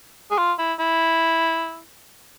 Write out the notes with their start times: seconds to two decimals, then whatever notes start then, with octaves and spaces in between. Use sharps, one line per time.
0.31 G#4
0.38 F4
0.59 E4
0.79 E4